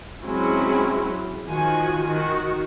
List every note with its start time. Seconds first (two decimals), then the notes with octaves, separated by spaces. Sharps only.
0.25 F#3 G#3 C4 C#4 E4 G#4
1.47 D#3 F3 F#4 G#5
2.06 D#3 F#4